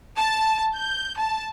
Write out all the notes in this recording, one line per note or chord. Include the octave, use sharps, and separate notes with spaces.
A5
G6
A5